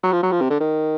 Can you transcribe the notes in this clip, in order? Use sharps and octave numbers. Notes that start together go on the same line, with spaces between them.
F#3
F3
F#3
F3
C3
D3
D#3